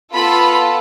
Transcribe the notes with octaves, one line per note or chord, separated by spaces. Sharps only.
B3 F4 A4 B5